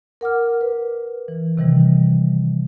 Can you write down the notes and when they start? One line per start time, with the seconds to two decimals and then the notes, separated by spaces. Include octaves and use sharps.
0.21 A#4 F#5 D6 F6
0.61 B4
1.28 E3
1.58 C3 D#3 E3 G3